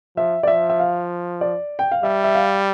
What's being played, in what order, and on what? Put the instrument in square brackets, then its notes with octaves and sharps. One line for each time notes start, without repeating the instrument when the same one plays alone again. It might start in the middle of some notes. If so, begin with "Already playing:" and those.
[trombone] F3 [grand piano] E5
[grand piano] D5
[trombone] F3 [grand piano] E5
[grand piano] E5
F5
D5
G5
F5
[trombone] G3 [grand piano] E5
[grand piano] E5
F5